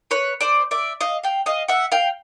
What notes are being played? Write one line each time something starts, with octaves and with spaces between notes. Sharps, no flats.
B4 C#5
C5 D5
D5 E5
D#5 F5
F5 G5
D#5 F5
E5 F#5
F5 G5